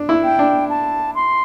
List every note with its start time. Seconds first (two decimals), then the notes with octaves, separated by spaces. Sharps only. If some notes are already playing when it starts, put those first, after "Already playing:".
Already playing: D4
0.09 E4
0.24 G5
0.39 D4
0.70 A5
1.15 C6